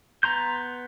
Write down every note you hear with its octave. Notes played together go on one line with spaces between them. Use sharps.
B3 A#5 C6 G6